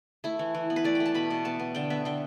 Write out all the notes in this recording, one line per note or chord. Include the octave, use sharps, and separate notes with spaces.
A3 E4
E3
E3
B3
B4
A3 D5
G5
A3
A5
B2 B5
B2
B3 A5
B3
D3 G5
B3 E5
D3 G5